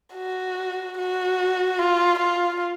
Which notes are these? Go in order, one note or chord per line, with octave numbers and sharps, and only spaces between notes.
F#4
F#4
F4
F4